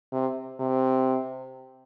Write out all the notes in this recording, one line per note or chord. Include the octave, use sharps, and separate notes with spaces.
C3
C3